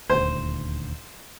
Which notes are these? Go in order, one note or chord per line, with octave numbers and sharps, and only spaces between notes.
D#1 D2 C5